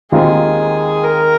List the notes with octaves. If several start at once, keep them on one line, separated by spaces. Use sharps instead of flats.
D#2 D#3 G#3 C4 F4 G#4
A#4